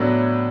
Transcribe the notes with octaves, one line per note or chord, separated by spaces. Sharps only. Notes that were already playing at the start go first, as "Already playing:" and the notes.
Already playing: A2 F#3 B3 D4